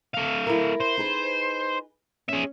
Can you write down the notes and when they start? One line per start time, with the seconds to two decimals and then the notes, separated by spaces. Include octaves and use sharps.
0.14 A3 F5
0.47 E4 A#4
0.80 C5
0.98 D#4 G#4 B4
2.29 C#4 G#4 E5